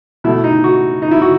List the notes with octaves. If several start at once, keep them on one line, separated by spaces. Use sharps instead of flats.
B2 A3 E4
D#4
F#4
D#4
E4
F#4